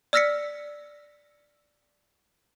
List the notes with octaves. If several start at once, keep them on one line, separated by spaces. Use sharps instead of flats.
D5 E6 F6 A#6 B6 C#7